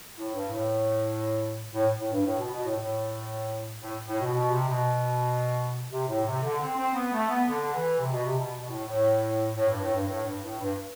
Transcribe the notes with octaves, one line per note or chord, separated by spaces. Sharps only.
A2
G2
A2
A2
A2
G2
A2
B2
B2
A2
A2
A2
A2
B2
B2
C3
B2
C3
A2
C3
D3
C4
C4
B3
A3
B3
D3
E3
C3
B2
C3
B2
B2
A2
A2
A2
G2
A2
G2
A2
G2
A2
G2